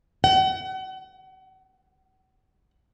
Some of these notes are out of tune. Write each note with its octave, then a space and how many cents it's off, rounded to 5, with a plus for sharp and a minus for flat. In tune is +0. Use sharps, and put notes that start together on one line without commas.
F#5 +40